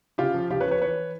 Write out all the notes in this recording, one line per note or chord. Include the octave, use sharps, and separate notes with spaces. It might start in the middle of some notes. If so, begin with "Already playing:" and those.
C#3 F4 G4
F3
C#3 F4 G4
B4 C#5
F3
B4 C#5
E3 B4 C#5